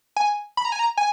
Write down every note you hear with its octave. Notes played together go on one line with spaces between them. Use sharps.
G#5
B5
A#5
G#5
A#5
G#5